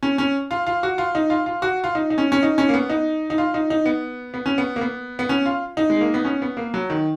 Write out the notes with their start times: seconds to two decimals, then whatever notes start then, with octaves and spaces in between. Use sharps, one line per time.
0.03 C#4
0.18 C#4
0.51 F4
0.66 F4
0.83 F#4
0.98 F4
1.15 D#4
1.30 F4
1.46 F4
1.62 F#4
1.84 F4
1.95 D#4
2.10 D#4
2.18 C#4
2.32 C#4
2.43 D#4
2.58 C#4
2.69 A#3
2.74 B3
2.90 D#4
3.30 D#4
3.38 F4
3.54 D#4
3.70 D#4
3.86 B3
4.34 B3
4.46 C#4
4.58 B3
4.76 A#3
4.81 B3
5.19 B3
5.29 C#4
5.46 F4
5.77 D#4
5.90 G#3
6.01 A#3
6.14 B3
6.25 C#4
6.42 B3
6.57 A#3
6.74 F#3
6.90 D#3